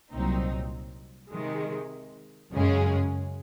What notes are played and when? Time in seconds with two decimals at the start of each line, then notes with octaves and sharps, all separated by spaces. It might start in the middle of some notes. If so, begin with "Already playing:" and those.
0.12 C2 A#2 F#3 C4 D#4
1.31 C3 D#3 G#3
2.51 F#2 C#3 G#3 C#4 G#4